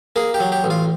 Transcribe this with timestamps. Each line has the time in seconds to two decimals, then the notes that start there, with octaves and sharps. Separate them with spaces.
0.16 A#3 G#4
0.34 G4
0.40 F#3
0.52 G4
0.64 A1
0.70 F4